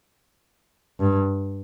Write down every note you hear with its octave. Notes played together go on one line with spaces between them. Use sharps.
G2